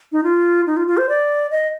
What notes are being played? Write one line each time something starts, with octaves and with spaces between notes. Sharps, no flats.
D#4
F4
D#4
F4
F4
C5
D5
D#5